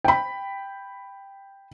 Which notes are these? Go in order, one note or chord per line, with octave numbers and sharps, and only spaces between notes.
G5 B5